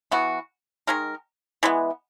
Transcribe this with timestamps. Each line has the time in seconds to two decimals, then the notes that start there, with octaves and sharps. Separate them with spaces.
0.11 E3 B3 F#4
0.87 D#3 G#3 D#4 A#4
1.63 E3 G#3 B3